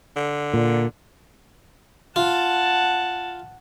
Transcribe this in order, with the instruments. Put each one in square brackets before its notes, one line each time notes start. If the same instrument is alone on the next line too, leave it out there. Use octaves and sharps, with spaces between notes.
[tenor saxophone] D3
[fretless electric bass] A#2
[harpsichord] F4 [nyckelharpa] F#5 A5